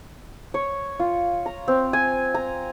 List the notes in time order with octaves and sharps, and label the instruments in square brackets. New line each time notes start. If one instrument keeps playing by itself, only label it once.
[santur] C#5
F4
A#5
C4
G#5
A#5